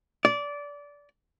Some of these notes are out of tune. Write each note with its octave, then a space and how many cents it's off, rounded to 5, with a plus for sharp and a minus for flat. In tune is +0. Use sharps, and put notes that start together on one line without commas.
D5 -20